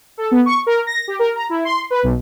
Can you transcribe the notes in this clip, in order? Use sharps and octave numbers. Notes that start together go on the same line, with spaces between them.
A4
B3
C#6
A#4
A#6
G4
A#4
A#5
E4
C6
B4
B1